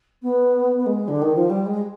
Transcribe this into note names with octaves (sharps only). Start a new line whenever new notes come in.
B3
B3
G#3
D3
D#3
F3
G3
G#3